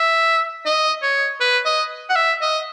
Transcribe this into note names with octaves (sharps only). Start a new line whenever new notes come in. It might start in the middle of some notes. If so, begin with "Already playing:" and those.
Already playing: E5
D#5
C#5
B4
D#5
F#5
E5
D#5